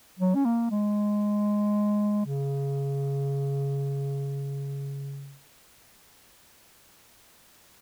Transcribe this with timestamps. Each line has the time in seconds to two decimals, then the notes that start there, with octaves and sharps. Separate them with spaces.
0.19 F#3
0.35 C#4
0.45 A#3
0.71 G#3
2.26 C#3